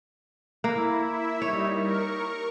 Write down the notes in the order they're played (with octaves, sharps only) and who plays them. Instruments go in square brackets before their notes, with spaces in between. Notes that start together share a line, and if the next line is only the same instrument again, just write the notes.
[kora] A#3 [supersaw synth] E4
[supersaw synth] E4 E5
[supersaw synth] G3 D#4 [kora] C#5
[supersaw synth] A#4 C#6